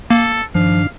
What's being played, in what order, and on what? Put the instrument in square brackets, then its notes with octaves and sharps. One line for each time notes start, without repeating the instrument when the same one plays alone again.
[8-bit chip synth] A#3 [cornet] A4
[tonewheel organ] G2 D#3 D4 [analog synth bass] F3 [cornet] F5